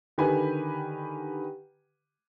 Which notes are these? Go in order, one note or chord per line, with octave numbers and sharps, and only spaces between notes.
D3 D#3 G4 B4 G#5 B5